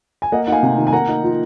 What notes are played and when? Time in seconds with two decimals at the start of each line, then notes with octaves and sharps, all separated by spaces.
0.22 G#5
0.32 A#3 D#5 F#5
0.47 D#4 F#5
0.52 F5 G#5
0.63 C3
0.78 D#3
0.87 G#5
0.92 A#3 F#5 A#5
1.08 D#4
1.23 F3